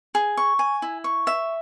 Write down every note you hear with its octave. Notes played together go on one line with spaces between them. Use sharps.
G#4
C#6
G#5
E4
C#6
E5